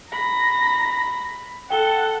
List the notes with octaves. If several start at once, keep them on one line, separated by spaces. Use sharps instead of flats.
A#5 B5 A#6
A4 F#5 G5 G7